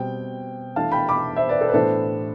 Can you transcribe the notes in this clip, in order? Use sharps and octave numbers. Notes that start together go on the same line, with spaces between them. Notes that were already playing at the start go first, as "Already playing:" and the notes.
Already playing: B2 G3 C4 G5
E3 A3 D4 F5 A5
G5 B5
B5 D6
C5 E5
B4 D5
A4 C5
B4
A2 E3 B3 D4 A4 C5